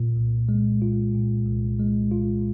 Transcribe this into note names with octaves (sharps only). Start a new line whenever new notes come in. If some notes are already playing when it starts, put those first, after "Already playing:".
Already playing: A#2
C2
G#3
F4
A#2
C2
G#3
F4